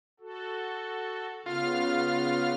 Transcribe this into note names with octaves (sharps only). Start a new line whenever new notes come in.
F#4 A4
C#3 B3 F4 F6